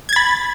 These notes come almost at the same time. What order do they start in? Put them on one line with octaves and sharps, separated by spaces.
G#6 A6 B5